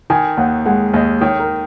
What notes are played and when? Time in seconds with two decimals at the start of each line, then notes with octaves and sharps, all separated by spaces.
0.10 D#3 G#5
0.37 D#2 F#5
0.66 G#3 F#5
0.93 D#2 D#5
1.21 D#3 C#5
1.40 A#4